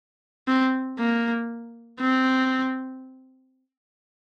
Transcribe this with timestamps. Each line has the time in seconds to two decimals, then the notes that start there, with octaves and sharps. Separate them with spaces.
0.48 C4
0.99 A#3
2.00 C4